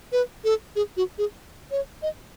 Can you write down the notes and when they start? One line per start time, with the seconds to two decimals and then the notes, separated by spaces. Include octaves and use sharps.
0.12 B4
0.44 A4
0.76 G#4
0.97 F#4
1.18 G#4
1.71 C#5
2.02 D#5